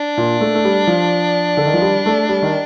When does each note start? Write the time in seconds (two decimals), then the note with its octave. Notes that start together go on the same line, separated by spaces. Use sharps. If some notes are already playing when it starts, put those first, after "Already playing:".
Already playing: D4
0.17 A#2
0.41 A3
0.55 A3
0.65 G3
0.87 F3
1.57 D3
1.66 D#3
1.73 F3
1.82 G3
2.06 A3
2.29 G3
2.42 D#3